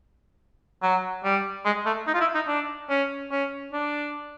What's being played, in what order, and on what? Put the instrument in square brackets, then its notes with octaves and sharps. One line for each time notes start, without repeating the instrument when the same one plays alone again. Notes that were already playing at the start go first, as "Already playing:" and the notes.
[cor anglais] F#3
G3
G#3
A3
D#4
F4
E4
D#4
D4
C#4
C#4
D4